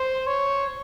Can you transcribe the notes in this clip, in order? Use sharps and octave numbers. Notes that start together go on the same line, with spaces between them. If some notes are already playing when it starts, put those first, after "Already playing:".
Already playing: C5
C#5